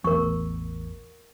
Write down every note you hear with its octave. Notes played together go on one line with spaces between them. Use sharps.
A1 E2 A#4 C#6